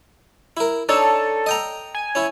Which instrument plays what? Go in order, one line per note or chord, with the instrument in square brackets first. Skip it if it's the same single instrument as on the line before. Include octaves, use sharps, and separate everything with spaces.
[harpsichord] E4 A#4
[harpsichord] D4 D#4 C#5 [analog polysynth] A4
[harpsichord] D#5 G5 A#5
[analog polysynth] G#5
[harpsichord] C#4 E4